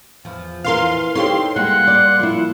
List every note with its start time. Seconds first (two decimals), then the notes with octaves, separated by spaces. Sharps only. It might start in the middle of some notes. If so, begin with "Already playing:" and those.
0.25 E2 F3
0.65 E3 A#4 F5 C6
1.15 C4 D#4 G4 A4 C#5 F5 C6
1.56 G3 G#3 A#3 F#5
1.87 D5
2.20 F3 E4